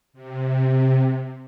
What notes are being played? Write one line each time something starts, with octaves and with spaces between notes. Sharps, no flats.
C3